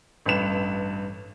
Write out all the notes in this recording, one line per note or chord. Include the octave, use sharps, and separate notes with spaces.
A1 G2 B4 E7